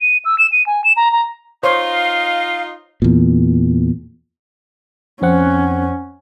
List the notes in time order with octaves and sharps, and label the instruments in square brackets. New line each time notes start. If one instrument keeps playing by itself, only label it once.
[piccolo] D#7
E6
E7
D#7
G#5
E7
A#5
A#5
[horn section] D#4 F4 D#5 [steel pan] C5 C#5 [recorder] F5
[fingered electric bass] E2 A#2
[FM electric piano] F2 C4 F#5 [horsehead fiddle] C#4